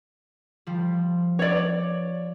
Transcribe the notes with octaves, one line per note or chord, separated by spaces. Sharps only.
F3 G3
C#5 D5